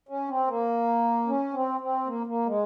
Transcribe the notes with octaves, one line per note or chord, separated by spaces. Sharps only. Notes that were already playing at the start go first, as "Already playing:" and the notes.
C#4
C4
A#3
C#4
C4
C4
A#3
A#3
G#3